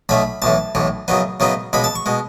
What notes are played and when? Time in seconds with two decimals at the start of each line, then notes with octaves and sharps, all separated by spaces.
0.09 B1 B2 A3 C#4 B5
0.42 B1 A2 E3 A5
0.75 B1 A2 E3
1.08 F#2 C#3 F#3 B3 D#4
1.40 F#2 C#3 F#3 B3 D#4
1.73 C#2 B2 G#3 B5
1.84 A5
1.95 C#6
2.06 B2 G#3